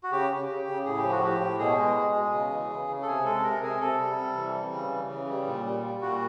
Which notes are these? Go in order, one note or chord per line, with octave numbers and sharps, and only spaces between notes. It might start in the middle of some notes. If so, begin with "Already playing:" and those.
F#4
C#3 G4
C#3
C#3
C#3
A2 G#4
G4
F3
F#4
A2 G4
A2
B2 G#4
G#3
G#3
B2
C#3
E3
C#3
C#3
A4
C3 G#4
G#3 A4
C3 A#4
C3 G#4
C3 A4
G3
C3
E3
G3
C#3
E3
C#3
G3
A#2
G3
G3
A#2 F#4